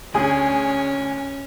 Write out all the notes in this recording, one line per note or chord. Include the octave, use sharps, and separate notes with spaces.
D2 C#4 G#4 D#6